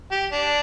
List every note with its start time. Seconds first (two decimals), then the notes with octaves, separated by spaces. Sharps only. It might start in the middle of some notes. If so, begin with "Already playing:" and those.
0.12 G4
0.32 D4